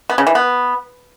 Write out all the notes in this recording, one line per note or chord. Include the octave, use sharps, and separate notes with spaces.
B3
C#3
E3
B3